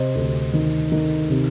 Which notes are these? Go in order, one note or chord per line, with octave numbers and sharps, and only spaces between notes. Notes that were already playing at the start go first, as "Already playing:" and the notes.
Already playing: C3 C5 D#5
D2
D#3
D#3
C3